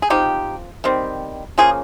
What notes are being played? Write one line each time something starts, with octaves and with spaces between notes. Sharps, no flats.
G#4
F3 C4 D#4 G4
D#3 G3 C4
C#3 F3 A#3 F4 G#4